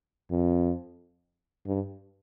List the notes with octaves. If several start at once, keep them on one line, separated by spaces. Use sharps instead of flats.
F2
G2